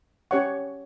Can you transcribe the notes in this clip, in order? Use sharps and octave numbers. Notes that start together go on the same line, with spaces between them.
C#4 G4 C#5 F#5 C#6